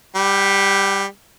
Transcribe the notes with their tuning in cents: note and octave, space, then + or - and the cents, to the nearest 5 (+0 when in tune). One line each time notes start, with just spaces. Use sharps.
G3 +10 G5 -45